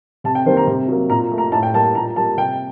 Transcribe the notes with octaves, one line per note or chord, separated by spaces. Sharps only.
C3 A5
G5
D#3 G3 A#3 C5
A#5
C3
F#3 A#3
A#2 A#5
A3
A#5
A2 A5
G5
G3 A#3 A5
A#2 A#5
G3 A#3 A5
C3 G5